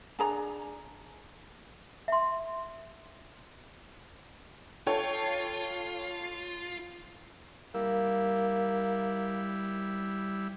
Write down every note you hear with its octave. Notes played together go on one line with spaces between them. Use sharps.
D4 G#4 A#5
E5 C6
F4 A4 C#5 G5
G3 A#3 E4